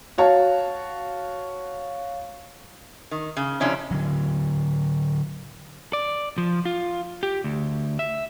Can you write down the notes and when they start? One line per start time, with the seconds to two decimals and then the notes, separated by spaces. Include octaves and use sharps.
0.18 F#4 C#5 F5 A5
3.11 D#3
3.37 C#3
3.60 F2 C3 C#4 D4 E4
3.91 D3 F#3
5.93 D5
6.38 F3
6.65 F4
7.23 G4
7.44 D2
7.99 E5